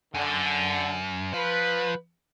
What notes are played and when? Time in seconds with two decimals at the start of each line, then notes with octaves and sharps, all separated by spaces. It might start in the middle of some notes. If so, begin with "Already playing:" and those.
0.14 F#2 D3
1.34 F3 B4